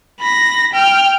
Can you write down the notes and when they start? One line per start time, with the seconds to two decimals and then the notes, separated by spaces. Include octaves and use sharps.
0.21 B5 A#6
0.73 G5 F6